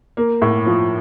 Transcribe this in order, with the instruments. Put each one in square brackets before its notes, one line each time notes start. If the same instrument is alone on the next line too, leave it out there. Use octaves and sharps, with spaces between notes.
[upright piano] A#3
A2
F3